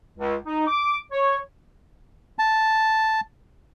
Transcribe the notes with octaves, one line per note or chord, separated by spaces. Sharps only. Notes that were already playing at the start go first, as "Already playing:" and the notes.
C#2
D#4
D6
C#5
A5